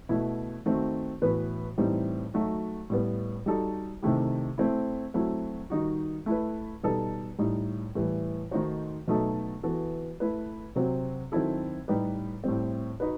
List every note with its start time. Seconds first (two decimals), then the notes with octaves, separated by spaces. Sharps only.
0.09 B2 A3 E4
0.66 D#3 A3 C4 F#4
1.22 A2 E3 B3 F#4 B4
1.78 A2 E3 G3 C4 D#4
2.34 F#3 A3 D#4 F#4
2.90 A2 G3 B3
3.46 G3 D#4 F#4 A4
4.02 C3 D#3 A3 E4 G4
4.58 A3 C4 E4
5.14 F#3 A3 C4 E4
5.70 D#3 G3 D#4 F#4
6.26 A3 E4 B4
6.83 B2 G3 B3 D#4 A4
7.38 A2 G3 D#4
7.95 A2 E3 G3
8.51 D#3 A3 D#4 F#4 C5
9.07 B2 F#3 A3 D#4 A4
9.63 E3 B3 F#4 A4
10.20 A3 E4 B4
10.76 C3 F#3 C4
11.32 D#3 F#3 C4 E4 A4
11.88 A2 G3 D#4 G4 B4
12.44 A2 G3 C4
13.00 D#4 F#4 B4